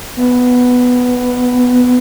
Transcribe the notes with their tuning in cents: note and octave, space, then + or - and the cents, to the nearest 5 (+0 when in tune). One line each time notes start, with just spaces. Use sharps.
B3 +5